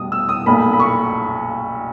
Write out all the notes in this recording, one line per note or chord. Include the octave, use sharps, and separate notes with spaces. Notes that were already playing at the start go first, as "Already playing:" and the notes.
Already playing: B2 G3 D#6
E6
D#6
B1 A#2 A#3 B5
B5
C#6